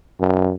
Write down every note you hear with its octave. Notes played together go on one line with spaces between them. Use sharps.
F#2